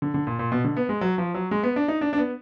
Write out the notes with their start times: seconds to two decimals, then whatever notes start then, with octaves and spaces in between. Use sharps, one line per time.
0.02 D3
0.14 D3
0.27 A#2
0.39 A#2
0.52 B2
0.64 D3
0.77 B3
0.89 G#3
1.01 F#3
1.18 F3
1.34 F#3
1.51 G#3
1.63 B3
1.76 D4
1.88 D#4
2.01 D4
2.13 D4
2.18 B3